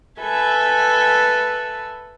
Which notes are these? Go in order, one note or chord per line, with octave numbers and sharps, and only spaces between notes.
A4 B4 E5 G#5